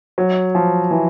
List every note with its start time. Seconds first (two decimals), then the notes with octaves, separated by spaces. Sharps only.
0.18 F#3
0.55 F3
0.91 E3